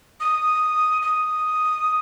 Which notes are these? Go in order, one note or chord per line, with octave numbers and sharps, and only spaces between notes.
D#6
D#6